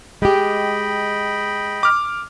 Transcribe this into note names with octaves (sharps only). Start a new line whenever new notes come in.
G#3 G4 D#5 G5 B5
D6 F6